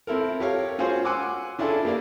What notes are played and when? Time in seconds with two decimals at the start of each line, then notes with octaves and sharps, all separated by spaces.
0.07 C4 E4 A4 A#4
0.40 G4 A4 A#4 C#5 F5
0.79 C#4 F4 F#4 G#4 C5 C#5
1.05 F#5 G#5 C6 D6 E6
1.59 C#4 D4 E4 F4 G#4 A4
1.85 A#3 G4 A#4 D5